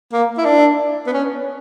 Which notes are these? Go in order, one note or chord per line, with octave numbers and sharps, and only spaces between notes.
A#3
E4
D4
B3
C#4